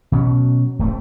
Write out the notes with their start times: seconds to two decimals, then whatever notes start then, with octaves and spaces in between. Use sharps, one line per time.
0.12 B2 F#3 C#4
0.79 D1 A3 C4